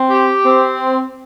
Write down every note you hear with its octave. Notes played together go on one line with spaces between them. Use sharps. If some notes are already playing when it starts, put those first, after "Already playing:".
Already playing: C4
G4
C4